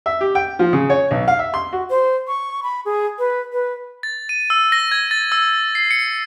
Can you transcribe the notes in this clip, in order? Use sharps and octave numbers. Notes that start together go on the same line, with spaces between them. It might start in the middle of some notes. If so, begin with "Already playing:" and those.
E5
G4
G5
F3
C#3
C#5
B1
F5
E5
C6
F#4
C5
C#6
B5
G#4
B4
B4
A6
D#7
E6
A#6
G#6
A6
E6
C7
C#7